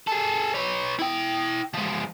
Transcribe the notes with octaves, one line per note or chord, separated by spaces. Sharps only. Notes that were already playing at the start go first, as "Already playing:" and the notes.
G#4 A4
B4 C#5
E4 G5
F3 G#3